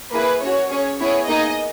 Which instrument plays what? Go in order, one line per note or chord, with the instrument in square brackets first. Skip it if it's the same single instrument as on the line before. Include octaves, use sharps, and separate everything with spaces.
[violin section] A#3 E4 G#4 B4
C#4 F#4 C#5
C#4 G#4 C#5
B3 E4 G#4 C#5
A#3 D#4 G#4 D#5